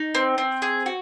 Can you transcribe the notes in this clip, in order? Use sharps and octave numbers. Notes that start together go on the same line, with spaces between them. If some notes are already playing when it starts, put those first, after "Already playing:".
Already playing: D#4
C4
C4
G#4
F#4